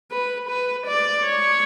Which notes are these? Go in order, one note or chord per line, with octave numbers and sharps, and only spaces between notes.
B4
B4
D5
C#5